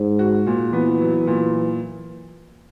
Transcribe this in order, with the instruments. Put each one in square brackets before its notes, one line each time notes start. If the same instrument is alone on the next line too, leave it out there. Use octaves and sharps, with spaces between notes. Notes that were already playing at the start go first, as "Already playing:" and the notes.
Already playing: [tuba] G#2
[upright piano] F#4
A#2
[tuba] E3 [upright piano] B3
[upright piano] F#3
A#2